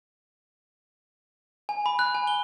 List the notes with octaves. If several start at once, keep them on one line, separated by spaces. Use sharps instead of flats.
G#5
B5
F#6
G#5
G7